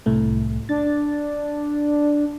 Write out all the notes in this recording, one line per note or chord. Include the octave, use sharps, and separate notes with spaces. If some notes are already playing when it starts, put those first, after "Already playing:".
C2 A2 A3
D4 A6